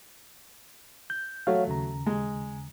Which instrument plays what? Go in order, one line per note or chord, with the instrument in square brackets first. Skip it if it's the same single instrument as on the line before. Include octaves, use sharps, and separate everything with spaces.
[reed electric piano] G6
[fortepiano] F#3 A3 [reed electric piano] F#4 C#5 F5
[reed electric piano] D#2 C#3 A#5
[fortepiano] G#3